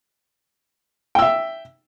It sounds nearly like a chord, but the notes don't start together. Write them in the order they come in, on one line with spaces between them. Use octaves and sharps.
G5 E6 E5